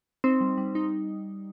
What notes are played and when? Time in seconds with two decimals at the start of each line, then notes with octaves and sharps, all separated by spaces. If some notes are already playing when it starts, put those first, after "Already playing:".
0.24 C4 D#4
0.41 G3
0.57 G3
0.75 D#4